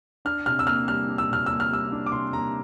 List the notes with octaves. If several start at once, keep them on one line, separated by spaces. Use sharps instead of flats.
D4 F6
C3 F6
E6
A#3 F6
G3 F6
D4
E6
C3 F6
A#3 E6
F6
G3 E6
D4
D6
C3 C6
A#3 A#5